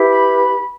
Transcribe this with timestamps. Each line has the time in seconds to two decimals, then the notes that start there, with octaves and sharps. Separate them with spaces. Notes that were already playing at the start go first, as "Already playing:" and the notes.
Already playing: E4 G4 B4
0.10 B5